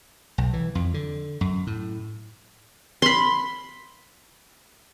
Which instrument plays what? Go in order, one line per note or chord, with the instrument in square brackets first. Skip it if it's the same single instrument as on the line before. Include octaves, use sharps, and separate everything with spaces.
[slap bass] B1
E3
F2
D3
F#2
A2
[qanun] B5 C6